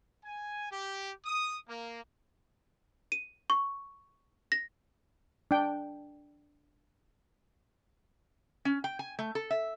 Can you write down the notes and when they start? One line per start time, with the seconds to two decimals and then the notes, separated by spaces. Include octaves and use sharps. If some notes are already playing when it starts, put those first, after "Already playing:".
0.24 G#5
0.70 G4
1.24 D#6
1.67 A#3
3.12 D#7
3.50 C#6
4.52 A#6
5.51 D4 G5
8.65 C#4
8.84 G5
8.99 G#5
9.19 A3
9.35 A4
9.51 E5